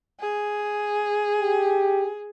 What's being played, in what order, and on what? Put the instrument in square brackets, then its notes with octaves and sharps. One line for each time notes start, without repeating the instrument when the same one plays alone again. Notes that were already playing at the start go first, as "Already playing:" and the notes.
[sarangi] G#4
[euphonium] G4